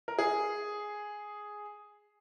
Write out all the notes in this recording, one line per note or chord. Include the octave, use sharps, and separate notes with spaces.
A#4
G#4